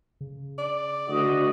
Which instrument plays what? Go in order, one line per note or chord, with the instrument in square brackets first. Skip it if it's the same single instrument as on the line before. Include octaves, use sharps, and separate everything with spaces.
[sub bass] C#3
[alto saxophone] D5
[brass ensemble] D2 F#4 D#5